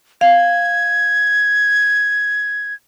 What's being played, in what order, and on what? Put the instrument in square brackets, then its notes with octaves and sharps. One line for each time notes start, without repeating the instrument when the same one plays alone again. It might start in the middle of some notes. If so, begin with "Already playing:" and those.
[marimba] F5 [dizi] G#6